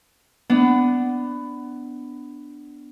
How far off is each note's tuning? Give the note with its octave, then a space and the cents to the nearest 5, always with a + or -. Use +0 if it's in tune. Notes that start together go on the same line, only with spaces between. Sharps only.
B3 +15 D4 +0